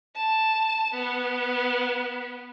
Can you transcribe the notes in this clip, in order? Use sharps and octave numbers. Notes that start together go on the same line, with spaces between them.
A5
B3